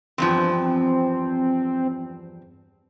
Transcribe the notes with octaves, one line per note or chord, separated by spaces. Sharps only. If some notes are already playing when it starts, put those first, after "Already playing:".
E2 G2 F3 C4